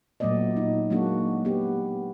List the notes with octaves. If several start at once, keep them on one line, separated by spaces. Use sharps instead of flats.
A#2 F#3 A3 B3 D5 D#5
D#4
F#3 G#3 A#3 D4 F#4
B3 G4